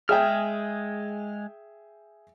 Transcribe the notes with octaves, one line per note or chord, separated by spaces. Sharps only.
G#3 G#4 E5 G5 F6